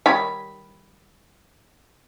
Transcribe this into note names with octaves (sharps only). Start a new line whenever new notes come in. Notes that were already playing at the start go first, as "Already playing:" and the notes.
D#3 G3 C#5 B5